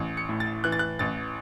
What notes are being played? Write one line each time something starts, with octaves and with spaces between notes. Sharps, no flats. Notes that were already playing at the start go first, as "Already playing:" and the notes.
Already playing: A1
C#7
A2
A6
E3 F#6
A6
F#6
A1 A6